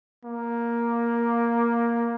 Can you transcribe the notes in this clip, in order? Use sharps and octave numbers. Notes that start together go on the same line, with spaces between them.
A#3